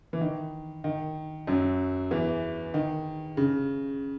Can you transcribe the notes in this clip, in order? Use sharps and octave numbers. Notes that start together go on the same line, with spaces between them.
E3
D#3
D#3
F#2 F#3
E2 E3
D#3
C#3